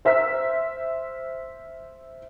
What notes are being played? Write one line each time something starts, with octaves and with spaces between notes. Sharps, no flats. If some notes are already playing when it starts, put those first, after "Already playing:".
C5 E5 E6 F6 B6